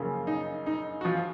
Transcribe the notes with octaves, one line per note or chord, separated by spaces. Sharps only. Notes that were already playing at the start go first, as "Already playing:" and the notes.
Already playing: F#2 C#3 F3 A#3
D#4
D#4
F#4
F3 F4